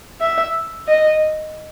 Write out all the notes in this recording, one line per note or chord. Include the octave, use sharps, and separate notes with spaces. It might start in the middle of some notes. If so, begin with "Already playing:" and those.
E5
D#5